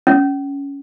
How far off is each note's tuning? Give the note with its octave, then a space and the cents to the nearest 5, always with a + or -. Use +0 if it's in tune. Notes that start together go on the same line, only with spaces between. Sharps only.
C#4 +10